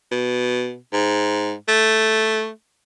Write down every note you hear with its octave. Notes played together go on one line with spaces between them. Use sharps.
B2
G#2
A3